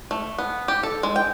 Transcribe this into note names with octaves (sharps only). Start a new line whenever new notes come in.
A3
B3
G4
A4
G#3
G5